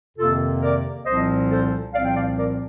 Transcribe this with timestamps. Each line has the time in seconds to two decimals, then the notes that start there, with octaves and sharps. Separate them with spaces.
0.18 F2 C3 D#3 A#3 F4 A4
0.61 A#4 D5
1.05 C2 A#2 F3 C4 C5 D#5
1.49 A4 C5
1.93 C2 A#2 F3 C4 D5 F5
2.04 G5
2.15 D5 F5
2.37 A#4 D5